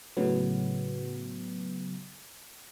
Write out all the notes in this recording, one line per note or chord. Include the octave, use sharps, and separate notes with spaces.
A2 C#3 F#3 B3